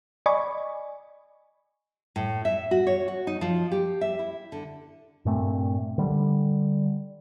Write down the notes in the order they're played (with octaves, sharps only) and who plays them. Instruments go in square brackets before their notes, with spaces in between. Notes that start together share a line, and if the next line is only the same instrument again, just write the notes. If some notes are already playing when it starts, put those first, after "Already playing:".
[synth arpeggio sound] D5 D#5 G#5 B5 C#6
[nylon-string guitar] A2
E5
F#4
C#5
F#4
D#4
F3
G4
E5
E4
D3
[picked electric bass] G2 A#2 A3 C4
D3 G3